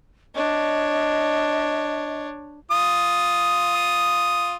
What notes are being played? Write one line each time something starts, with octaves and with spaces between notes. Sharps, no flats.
D4 C#5 D#5
F4 D#6